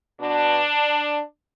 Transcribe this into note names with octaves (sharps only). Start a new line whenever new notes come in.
B2 D4